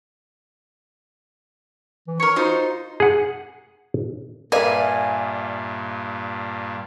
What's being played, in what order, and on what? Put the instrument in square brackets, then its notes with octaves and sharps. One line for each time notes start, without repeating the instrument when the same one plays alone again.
[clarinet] E3
[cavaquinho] A#4 C#5 [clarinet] C#6
[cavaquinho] D#4 F4 C5 [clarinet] F#4
[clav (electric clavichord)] G#4 F#5
[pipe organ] G2 A#2 [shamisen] A#4 B4 [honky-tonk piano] D5 E5 F5 [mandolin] G#5